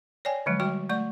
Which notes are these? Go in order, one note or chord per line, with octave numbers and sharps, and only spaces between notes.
C#5 D5 G5 G#5
D3 F3 F#3 G#3
G3 F#4 G5 C#6
A3 D5 C#6